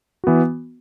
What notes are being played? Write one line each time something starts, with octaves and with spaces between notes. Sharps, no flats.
E3 B3 F#4